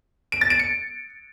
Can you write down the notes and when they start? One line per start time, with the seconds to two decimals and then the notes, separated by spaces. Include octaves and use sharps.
0.32 D7
0.41 A6
0.50 D7
0.59 C#7